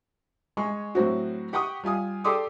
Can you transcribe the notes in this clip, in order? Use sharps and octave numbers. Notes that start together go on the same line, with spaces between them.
G#3 G#5 C#6
A2 F#3 C4 F#4
G4 F#5 G5 C#6 D#6
G3 F4 G#5 D#6
G4 A4 D5 C6 D6 D#6